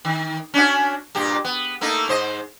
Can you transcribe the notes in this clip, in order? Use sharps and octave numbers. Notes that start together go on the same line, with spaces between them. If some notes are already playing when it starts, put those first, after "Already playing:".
D#3
C#4 D4 F#4
G2 A#2 G4
B3
A3 A#3 D#4
G#2 C5 D#5